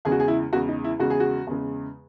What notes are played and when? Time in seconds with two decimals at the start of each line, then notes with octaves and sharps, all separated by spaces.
0.05 E2 C#3 G#3 G#4
0.12 F#4
0.20 G#4
0.28 E4
0.53 E2 C#3 G#3 F#4
0.68 D#4
0.84 E4
0.99 E2 C#3 G#3 F#4
1.10 G#4
1.20 F#4
1.47 E2 C#3 G#3